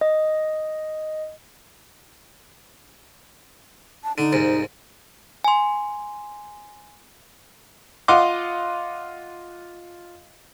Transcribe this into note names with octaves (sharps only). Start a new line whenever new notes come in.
D#5
A5
D3 D#4
C2 G#2
G#5 C6
F4 D#5 F5 F#5 C6 D6